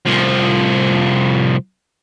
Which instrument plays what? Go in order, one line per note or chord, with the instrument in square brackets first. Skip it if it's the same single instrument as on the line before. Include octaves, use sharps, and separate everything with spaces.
[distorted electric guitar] C2 F3